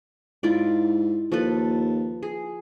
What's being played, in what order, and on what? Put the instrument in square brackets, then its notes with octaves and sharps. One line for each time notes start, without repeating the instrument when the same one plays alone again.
[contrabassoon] G#2 [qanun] E4 F4 D5
[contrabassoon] D#2 [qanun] F3 A4 B4
[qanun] G#4